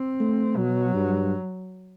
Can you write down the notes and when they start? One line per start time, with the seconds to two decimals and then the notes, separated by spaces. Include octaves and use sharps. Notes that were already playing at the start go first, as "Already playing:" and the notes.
Already playing: C4
0.20 A3
0.57 B2 F#3
0.94 G2